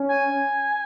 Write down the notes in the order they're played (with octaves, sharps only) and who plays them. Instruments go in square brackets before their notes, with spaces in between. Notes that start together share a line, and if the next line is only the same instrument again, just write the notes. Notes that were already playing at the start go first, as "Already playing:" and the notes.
Already playing: [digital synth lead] C#4
[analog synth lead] G#5